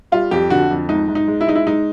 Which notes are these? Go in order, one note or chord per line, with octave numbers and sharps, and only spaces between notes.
G3 F4
F2 G4
D3 F#4
F2
G#2 D#4
G#2
D#4
G#3
E4
G#3 D#4
E4
G#3 D#4